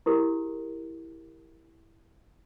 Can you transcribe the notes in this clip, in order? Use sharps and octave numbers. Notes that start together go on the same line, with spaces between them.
E4 G4 G#4 A#4